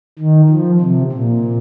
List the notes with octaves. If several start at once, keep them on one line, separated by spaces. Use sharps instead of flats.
D#3
F3
C3
A#2